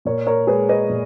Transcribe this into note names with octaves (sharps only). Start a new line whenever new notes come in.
A#2 A#4 C#5
A#4 C#5
G#3 G#4 B4
B4 D#5
A#2